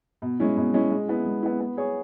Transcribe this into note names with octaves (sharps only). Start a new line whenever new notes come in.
B2
G#3 C#4 E4
B2
G#3 C#4 E4
G#3
B3 E4
G#3
B3 E4
B3
G#4 C#5